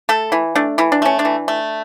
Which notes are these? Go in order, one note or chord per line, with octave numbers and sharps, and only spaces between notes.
A3 A4
E3 E4
A3 D4
E3 E4
D4
A3 C#4
D4
E3
A3